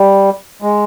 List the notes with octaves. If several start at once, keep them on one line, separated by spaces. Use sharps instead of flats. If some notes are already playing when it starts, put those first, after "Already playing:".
Already playing: G3
G#3